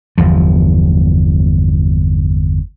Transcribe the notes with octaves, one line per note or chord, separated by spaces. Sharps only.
G1 E2 F3